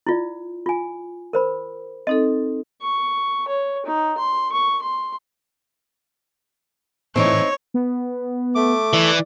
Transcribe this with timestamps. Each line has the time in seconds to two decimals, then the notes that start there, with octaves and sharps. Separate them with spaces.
0.07 E4 F4 D5
0.66 F4 G#5
1.33 A#4 C5 B5
2.07 C4 D#4 A4 D#5
2.82 C#6
3.48 C#5
3.86 D#4
4.18 C6
4.52 C#6
4.82 C6
7.16 A2 E3 C4 D4 D#4 C#5
7.74 B3
8.55 A3 D6
8.93 E3 D5